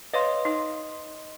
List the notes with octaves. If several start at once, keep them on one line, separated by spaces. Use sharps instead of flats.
B4 C#5 D#5 F5 C6
D#4